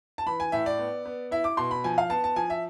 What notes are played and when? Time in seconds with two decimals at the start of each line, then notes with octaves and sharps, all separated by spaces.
0.18 A5
0.26 E3 B5
0.40 G#5
0.52 A2 E5
0.66 D5
0.78 B3
1.05 B3
1.31 E4 E5
1.44 D6
1.57 B2 C6
1.71 B5
1.84 F3 G#5
1.98 F5
2.10 B3 A5
2.24 A5
2.36 F3 G#5
2.50 E5